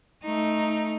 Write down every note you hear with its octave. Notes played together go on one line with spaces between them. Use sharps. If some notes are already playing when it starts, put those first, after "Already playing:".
A3 D#4